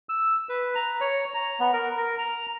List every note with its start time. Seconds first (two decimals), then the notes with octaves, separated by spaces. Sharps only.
0.09 E6
0.49 B4
0.75 A#5
1.01 C#5
1.34 A#5
1.60 B3
1.73 A#4
1.97 A#4
2.18 A#5